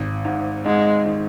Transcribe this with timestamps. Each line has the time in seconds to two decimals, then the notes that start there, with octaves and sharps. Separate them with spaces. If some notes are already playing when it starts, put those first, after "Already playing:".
Already playing: G#1
0.25 G#2
0.65 G#2 G#3
1.06 D#3